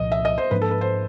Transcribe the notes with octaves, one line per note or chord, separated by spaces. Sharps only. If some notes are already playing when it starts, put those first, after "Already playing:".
Already playing: C2 A#2 F3 D#5
E5
D#5
C5
G#2 F3 A#3 D4 B4
A4
B4
C5